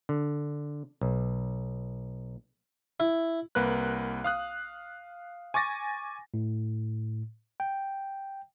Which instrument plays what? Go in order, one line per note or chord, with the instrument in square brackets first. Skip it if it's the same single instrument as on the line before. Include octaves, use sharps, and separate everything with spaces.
[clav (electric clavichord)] D3
B1
[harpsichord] E4
[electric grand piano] C2 A#3 B4 F#6
F5 D#6 F#6
G#5 C#6 D6 A6 A#6
[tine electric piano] A2
G5